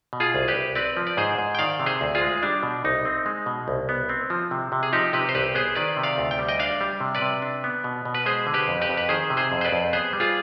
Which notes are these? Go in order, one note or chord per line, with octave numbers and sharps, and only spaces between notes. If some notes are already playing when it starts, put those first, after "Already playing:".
B2
F4 G#4
C2
G4 B4
C2
C4 B4 D5
F3
D5
G#2 G#4 C5
G#2
G5
D#3 D5 F5
C3
G#4 C5
D2
F4 G#4
G#3
G3 D4
B2
C2 D#4
C4
G#3
B2
C2
B3
C4
F3
C3
C3
G#4
F3 D#4 G4
C3 G4 B4
C5
C2 G4 B4
B3 G#4 C5
D#3 B4 D5
C3
D5 F5
D2
G5
G3
D#5 G5
D4 D5 F5
G3
C3
B4 D5
C3
D4
B3
B2
B2
B4
G#3 G#4 C5
D3
G4 B4
F2
G4 B4
F2
B4
D#3 G#4 C5
C3
G#4 C5
F2
C5
B4 D5
F2
B3 G#4 C5
G3
F4 G#4